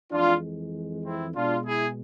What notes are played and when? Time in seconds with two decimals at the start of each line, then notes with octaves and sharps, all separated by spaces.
0.12 F2 E3 G#3 D4 F4
1.04 C4 E4
1.35 B2 G#3 D4 F4
1.65 E4 G#4